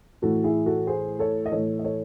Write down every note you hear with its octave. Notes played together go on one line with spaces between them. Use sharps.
A2 E3 F#4 A4
E4 G#4
F#4 A4
G#4 C5
A4 C#5
D#5
A2 E3 A4 C#5
D#5
A4 C#5